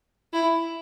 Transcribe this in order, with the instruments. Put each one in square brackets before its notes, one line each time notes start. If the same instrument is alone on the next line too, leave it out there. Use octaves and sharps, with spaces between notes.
[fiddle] E4